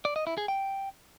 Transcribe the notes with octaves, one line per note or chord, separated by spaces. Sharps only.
D5
D#5
E4
G#4
G5